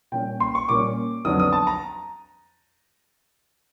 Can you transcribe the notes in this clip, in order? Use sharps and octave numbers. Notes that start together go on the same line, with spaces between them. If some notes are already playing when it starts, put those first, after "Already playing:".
A#2 G3 A#3 C#4 G5
C6
C#6
A#2 G3 A#3 C#4 D6
F2 D3 F#3 B3 D4 D#6
D#6
A5
A#5